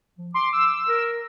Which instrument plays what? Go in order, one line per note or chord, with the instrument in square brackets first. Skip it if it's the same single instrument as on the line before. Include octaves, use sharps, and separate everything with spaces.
[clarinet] F3
[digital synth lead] C6 [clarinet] D6
[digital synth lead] E6
[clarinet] A#4